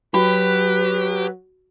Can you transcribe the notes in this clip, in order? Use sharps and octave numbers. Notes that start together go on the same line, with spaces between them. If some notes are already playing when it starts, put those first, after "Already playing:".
F#3 F#4 G4 B4